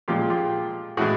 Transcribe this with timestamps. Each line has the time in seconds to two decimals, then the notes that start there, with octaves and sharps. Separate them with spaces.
0.08 A#2 F3 G#3 F4 G4
0.30 F4 G4
0.97 A2 E3 G#3 F#4 G#4